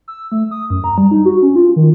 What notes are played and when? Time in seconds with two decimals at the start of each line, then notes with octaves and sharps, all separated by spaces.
0.08 E6
0.32 A3
0.51 D#6
0.70 F#2
0.84 A#5
0.98 G3
1.11 D#4
1.25 F#4
1.42 C#4
1.56 F4
1.76 D#3